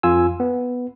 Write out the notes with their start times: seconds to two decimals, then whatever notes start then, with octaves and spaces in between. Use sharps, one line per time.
0.03 F2 F4 G#5 E6
0.40 B3